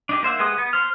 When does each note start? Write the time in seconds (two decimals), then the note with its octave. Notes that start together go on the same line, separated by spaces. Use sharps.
0.09 D4 D#4 G4
0.23 A#3 C5 E5 F#5
0.39 G#3 G4 B4 F#5 D#6
0.58 B3
0.73 C5 F6